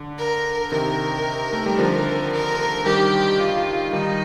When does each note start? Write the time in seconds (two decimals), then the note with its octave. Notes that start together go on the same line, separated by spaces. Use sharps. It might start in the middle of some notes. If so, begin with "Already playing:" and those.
Already playing: D3
0.18 A#4
0.72 C3 D#3 A#4
1.53 A3
1.66 G3
1.79 D3 F3
2.32 A#4
2.86 D#3 G3 G4
3.40 F4
3.93 D#3 G3 D#4